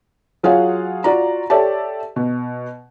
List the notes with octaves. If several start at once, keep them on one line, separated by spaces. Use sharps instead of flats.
F#3 F4 G#4 C#5 F5 F#5
F4 F#4 D5 A#5
G4 A4 C#5 D5 E5 A5
B2